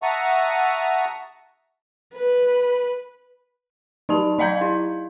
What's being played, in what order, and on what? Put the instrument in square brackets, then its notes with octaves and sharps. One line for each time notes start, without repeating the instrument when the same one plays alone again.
[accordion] E5 F#5 A5 A#5 C#6 D#6
[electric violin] B4
[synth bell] F#3 D#4 G4 A5
F#3 D#5 F5 A#5 G6 G#6
E4